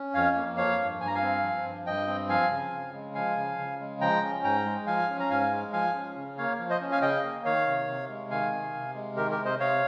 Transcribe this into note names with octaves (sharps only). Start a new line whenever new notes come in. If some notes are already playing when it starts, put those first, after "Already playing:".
Already playing: C#4
F2 C#5 F5
A#3
F3 C#5 F5
G2
G2 G#5
A#5
F5 G#5
C4
F3
G2
G2 D#5 G5
C4
F3 F5 G#5
C#3
C#3
G#3
F3 F5 G#5
C#3
C#3
G#3
F3 G5 A#5
C#4
G#2 G5 A#5
G#3
F3 F5 G#5
C#4
A#5
G#2 F5 G#5
G#3
F3 F5 G#5
C#4
C#3
A#3 C#5 F5
F3
C5 D#5
C#4
F5 G#5
C#3 D#5 G5
A#3
D#3 C#5 F5
C3
C3
G#3
D#3 F5 G#5
C3
C3
G#3
D#3 G4 A#4
G4 A#4
C3
C5 D#5
C3 C#5 F5